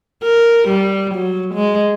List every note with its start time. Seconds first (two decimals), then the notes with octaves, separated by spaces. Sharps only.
0.23 A#4
0.68 G3
1.14 F#3
1.54 G#3